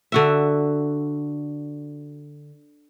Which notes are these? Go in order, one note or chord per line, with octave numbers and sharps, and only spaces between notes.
D3 F#4 E5